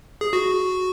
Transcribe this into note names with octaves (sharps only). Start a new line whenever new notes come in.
G#4
F#4